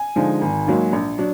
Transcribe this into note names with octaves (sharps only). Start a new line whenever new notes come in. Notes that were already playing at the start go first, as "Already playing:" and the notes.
Already playing: G#5
D3 F3 G#3 D#4
G#1
G#2 F#3 A#3 D#4
A#1
F#3 D4